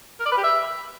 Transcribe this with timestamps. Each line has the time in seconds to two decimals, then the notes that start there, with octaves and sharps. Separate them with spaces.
0.20 A#4
0.26 D5
0.32 B4
0.38 G4
0.44 E5